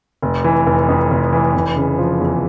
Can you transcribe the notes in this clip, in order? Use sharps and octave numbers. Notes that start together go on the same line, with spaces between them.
F1
E3
F1
F2
F1
E3
F1
C#3
F3
E2